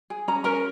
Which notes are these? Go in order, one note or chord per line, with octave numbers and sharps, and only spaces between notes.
G#4
C#4 A#5
C#4 A#4 A#5